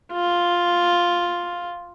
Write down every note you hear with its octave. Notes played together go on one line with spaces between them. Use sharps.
F4